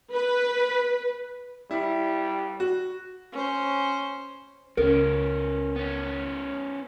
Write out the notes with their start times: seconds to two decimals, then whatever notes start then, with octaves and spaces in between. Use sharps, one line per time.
0.13 B4
1.71 G3 E4
2.60 F#4
3.32 C#4 C5
4.77 C#2 B3 C#4 A#4
5.76 B3 C#4